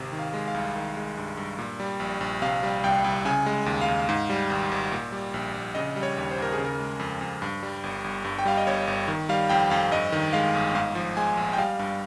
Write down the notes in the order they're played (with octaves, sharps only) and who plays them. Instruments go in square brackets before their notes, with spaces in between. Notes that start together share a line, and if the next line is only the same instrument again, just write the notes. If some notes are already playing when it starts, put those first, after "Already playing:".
Already playing: [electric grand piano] G#1 C3
D#3
F5
G#3
F5
C2
D#3
G#3
G2
G2
A#2
G3
A#1
A#1
C3 F5
G3
C2 G5
C2
C#3 G#5
G#3
D#2
F5
D#2
G#2
G3
G#1
G#1
A#2
G3
A#1
A#1
C#3 D#5
G3
C#5
D#2
C5
D#2 A#4
G#4
C#3
A#4
G#3
F2
F2
G2
G3
G1
G1
G2
G5
G3 F5
D#5
G1 C#5
G1
D#3
G3 F5
F2 G5
F2 F5
G2 D#5
D#3
G#3 F5
G1
G#2 F5
F3
G#3 G#5
A#1
G5
G3 F5
G2